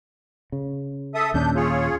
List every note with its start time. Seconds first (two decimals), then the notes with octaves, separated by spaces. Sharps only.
0.52 C#3
1.15 A4 E5 D#6
1.34 D#2 A#2 C#4 D4 G6
1.56 F4 G#4 C#5